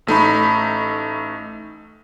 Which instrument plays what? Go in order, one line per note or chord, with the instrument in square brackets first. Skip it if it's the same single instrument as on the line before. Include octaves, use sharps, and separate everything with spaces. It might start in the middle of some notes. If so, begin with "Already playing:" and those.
[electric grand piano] A1 A3 D#4 B5